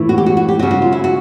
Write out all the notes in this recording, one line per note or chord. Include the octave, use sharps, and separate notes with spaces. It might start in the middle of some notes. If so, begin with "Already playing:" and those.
Already playing: A2 E3
F#4
G4
F#4
F#4
G4
C#3 F#3 F#4
F#4
F4
E4
F#4